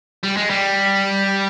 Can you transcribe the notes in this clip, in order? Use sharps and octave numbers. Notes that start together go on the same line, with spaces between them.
G3
G#3
G3